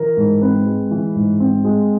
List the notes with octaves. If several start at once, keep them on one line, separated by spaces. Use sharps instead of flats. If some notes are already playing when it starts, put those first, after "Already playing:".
Already playing: E3 A#4
G#2
C4 B4
G#3
E3
G#2
C4
G#3